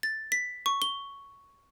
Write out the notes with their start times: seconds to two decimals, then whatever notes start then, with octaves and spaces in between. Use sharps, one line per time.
0.03 A6
0.32 B6
0.66 C#6
0.82 G7